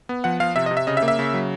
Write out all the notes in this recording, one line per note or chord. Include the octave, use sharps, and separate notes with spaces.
B3
F3 F#5
F3 F5
C3 E5
D#5
C3
E5
C#3 D#5
E5
A#3
E5
C#3
F#3